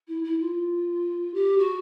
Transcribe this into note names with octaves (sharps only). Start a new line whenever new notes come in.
E4
E4
F4
G4
F#4